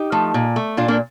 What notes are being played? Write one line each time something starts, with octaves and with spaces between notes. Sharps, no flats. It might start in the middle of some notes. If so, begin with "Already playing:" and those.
Already playing: D#4 G4
F3 A3
A#2
A3
A#2 D4 F4
A#3 D4